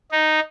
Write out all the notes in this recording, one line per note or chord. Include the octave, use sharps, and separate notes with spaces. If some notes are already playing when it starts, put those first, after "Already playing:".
D#4